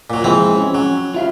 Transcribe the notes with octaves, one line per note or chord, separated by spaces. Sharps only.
A#2 F#3
E3 F3 G#3 C4
C#4
F#3
F4 E5 F5